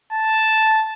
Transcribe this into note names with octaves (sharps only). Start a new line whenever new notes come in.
A5